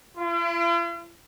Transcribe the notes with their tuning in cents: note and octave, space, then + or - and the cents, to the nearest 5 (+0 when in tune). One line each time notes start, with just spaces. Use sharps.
F4 -45